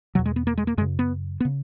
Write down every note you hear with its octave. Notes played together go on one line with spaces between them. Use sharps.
E2 B2 F#3
G#3
B3
A#3
G#3
A#3
F#2 C#3 G#3
B3
B3
C#3